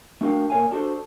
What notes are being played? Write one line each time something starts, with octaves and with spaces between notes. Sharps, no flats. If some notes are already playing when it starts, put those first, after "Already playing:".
A3 D4 F#4 A#4 F5 G5
A#2 A#4 C#5 F5 G#5
D4 F#4 A4 A#4 C5